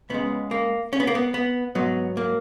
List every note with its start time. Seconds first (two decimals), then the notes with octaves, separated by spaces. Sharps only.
0.10 C#2 C#3 G#3 B3
0.51 A#3
0.93 C#4
1.00 B3
1.07 A#3
1.15 B3
1.34 B3
1.75 G#2 F#3 B3
2.17 A#3